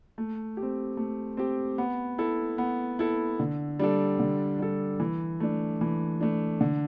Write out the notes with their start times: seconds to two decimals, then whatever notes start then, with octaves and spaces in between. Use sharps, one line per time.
0.18 A3
0.57 G4
0.62 C4
0.97 A3
1.37 C4 G4
1.78 B3
2.18 E4 A4
2.58 B3
2.99 E4 A4
3.39 D3
3.79 G3 D4 A4
4.19 D3
4.59 G3 D4 A4
5.00 E3
5.40 A3 D4
5.81 E3
6.21 A3 D4
6.61 D3